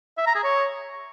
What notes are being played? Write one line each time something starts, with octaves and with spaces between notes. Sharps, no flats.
E5
A#5
G#4
C#5